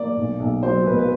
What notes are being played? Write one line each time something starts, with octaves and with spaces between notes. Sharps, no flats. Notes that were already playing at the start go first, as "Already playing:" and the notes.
Already playing: A#3 D5
B1
B1
F#3 C5
B2 B4
B4